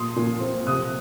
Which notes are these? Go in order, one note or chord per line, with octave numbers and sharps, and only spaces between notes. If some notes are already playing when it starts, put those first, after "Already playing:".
Already playing: A#2 C6 D#6
A#2
C4
C3 D#6 F#6